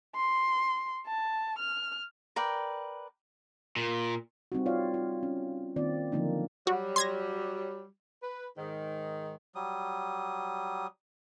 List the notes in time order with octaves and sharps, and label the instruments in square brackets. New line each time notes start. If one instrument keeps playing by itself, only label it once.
[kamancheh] C6
A5
F6
[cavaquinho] A#4 B4 D5 G5
[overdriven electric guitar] A#2
[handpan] G3 C4 D#4 F#4
F4 C#5 D5 F5
F4
C#4
D#3 A#3 C4 F4 D5
D3 F3 F#3 A#3 D4 D#4
[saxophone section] F#3 G3 [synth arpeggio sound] F#4
[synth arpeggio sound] C6 G#6 A#6
[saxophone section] B4
G#2 D#3
[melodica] F#3 G3 D#6